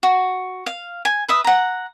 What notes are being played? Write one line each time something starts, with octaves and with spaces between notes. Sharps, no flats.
F#4
F5
G#5
B4 E5 D#6
F#5 A#5